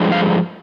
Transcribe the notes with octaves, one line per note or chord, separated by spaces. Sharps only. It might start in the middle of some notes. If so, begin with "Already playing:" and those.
Already playing: G2 D3 F3 G#3
F5